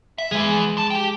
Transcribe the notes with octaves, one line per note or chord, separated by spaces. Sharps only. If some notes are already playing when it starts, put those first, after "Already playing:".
E5
E3 G#3 G#4
G2 A5
G4 G5